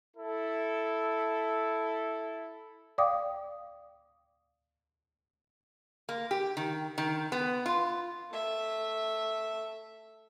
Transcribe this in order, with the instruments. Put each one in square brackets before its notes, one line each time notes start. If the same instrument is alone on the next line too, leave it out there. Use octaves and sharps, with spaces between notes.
[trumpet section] E4 A4
[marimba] D5 F5 G5 D6 D#6
[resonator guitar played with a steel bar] A#3
G4
D#3
D#3
B3
F4
[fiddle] A3 E5